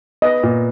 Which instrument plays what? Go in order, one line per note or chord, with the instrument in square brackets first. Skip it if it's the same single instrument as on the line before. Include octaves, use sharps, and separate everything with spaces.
[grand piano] B3 [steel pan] D#5
[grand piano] A#2